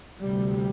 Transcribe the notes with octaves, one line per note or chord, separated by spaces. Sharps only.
D2 C3 G3